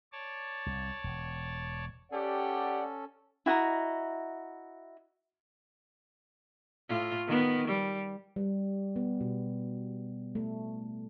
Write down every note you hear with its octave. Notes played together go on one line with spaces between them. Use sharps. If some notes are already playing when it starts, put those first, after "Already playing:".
C#5 D5 A5
C2
E1
C#4 G4 A4 D5 F#5
E4 F#4 D#5 A#5
A2 F4
D#3 B3
G3
G3
B3
B2
A3